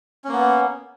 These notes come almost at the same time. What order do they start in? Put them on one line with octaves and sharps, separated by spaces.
C#4 A#3 B3